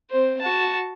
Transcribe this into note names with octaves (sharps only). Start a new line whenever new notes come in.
C4 C5
F#4 A5